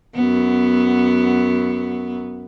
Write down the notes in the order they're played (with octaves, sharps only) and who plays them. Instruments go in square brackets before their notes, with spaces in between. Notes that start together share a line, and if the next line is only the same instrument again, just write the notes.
[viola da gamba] F#2 B3